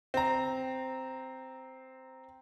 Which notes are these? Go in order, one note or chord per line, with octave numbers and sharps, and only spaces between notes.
C4 A#5